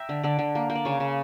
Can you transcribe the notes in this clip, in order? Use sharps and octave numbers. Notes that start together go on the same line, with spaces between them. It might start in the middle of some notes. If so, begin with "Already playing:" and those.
Already playing: E5 G5 A#5
D3
D3 D5
D3
A#3
A#3
D5
C#3 C#5
C#3